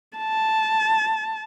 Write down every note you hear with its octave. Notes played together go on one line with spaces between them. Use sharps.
A5